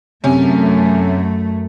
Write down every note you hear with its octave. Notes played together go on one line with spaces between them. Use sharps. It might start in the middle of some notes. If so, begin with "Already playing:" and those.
F#2 C3 A3 C#4